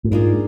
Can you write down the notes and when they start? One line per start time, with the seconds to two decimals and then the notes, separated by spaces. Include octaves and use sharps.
0.04 A2
0.11 G#2 A#3 D4 F4 G#4